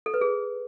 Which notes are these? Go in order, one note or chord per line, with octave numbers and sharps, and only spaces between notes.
A4
B4
G#4